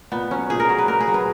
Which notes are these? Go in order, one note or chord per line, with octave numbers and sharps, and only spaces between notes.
A#2 B3
F#3 C#4
A#2 G#4
A#4
F#3
B4
A#2 A#4
G#4
F#3
B4